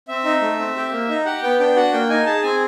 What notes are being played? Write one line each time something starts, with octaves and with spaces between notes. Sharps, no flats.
C4 E5
D#4
A3
C4
G4
A#3
D#4
G4 F#5
B3 G5
D4 G5
F#4 F#5
A#3 G5
D#4 G#5
G#4 A5
C4 G#5